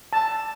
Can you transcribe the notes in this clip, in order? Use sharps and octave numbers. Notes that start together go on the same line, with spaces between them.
A5